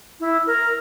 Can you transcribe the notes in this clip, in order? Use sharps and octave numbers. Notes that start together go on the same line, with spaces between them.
E4
A#4